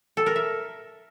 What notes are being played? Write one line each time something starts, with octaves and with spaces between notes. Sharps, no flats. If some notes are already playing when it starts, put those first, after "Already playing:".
A4
A#4
E5